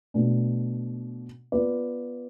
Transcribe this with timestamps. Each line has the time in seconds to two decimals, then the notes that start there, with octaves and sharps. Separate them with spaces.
0.14 B2 A3 D4
1.52 B3 F4 B4 D5